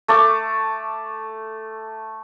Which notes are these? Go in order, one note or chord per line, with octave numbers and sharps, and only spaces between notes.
A3 A5 D6